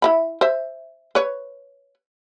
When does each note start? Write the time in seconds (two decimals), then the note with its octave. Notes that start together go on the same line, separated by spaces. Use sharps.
0.02 E4 E5 B5
0.41 C5 E5
1.15 B4 C#5